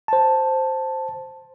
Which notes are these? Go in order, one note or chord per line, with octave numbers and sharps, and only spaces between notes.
C5 A5